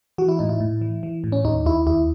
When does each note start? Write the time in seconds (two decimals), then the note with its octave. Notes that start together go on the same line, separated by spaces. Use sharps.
0.18 E3 F#4
0.29 E4
0.39 A2 D#4
0.49 E4
0.60 A2
0.81 E3
1.03 E3
1.24 A2
1.32 C#4
1.44 D#2 D#4
1.65 D#2 E4
1.87 D#2 E4